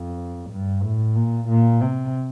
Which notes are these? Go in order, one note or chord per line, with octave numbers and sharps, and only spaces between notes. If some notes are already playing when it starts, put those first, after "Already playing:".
Already playing: F2
G2
A2
A#2
A#2
C3